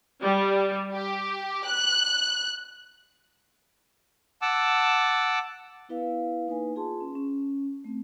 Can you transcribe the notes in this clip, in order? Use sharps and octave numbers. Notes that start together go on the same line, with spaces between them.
G3
G4
F#6
F#5 A5 D6 E6
B3 E4 B4 F5
A#3 D#4 B4 G#5
F4 G#4 A5 C6
C#4
C#4
A3 C4